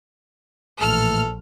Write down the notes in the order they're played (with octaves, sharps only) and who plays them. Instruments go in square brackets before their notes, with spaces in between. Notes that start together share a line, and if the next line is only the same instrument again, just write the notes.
[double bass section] A#1 [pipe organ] A2 E3 A3 [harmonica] A4 [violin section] F6